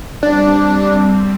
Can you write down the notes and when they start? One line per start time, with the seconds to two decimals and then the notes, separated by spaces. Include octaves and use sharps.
0.23 G3 C4 D4